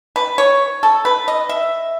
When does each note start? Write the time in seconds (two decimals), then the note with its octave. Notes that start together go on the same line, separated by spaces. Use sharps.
0.16 B4
0.38 C#5
0.83 A4
1.05 B4
1.28 D#5
1.49 E5